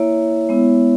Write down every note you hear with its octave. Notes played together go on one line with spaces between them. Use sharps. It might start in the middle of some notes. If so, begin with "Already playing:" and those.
Already playing: A#3 E4 C#5 E5
G#3 B3 E4